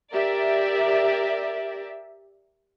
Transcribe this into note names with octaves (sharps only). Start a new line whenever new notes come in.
G4 A#4 D5 E5